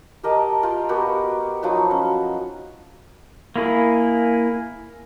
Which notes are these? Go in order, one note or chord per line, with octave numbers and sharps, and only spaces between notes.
G4 A#4 D#5 A5
F4 G5
B3 F#4 G4 A#4
F3 F#3 D#4 F#4
C#4
A#3 E4 G#4